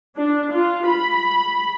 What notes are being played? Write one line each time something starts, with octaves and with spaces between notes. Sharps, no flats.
D4
F4
B5